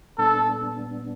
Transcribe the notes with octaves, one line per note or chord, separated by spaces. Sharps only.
A#2 G3 B3 D4 A4